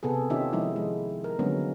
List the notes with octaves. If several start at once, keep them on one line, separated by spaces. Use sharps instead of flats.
C3 B3 G#4 A4
D#3 C#4 D#4 F4 G4 E5
F3 G#3 D#4 E4
G#3
A#4
D3 F#3 G#3 A#3 B3 C#4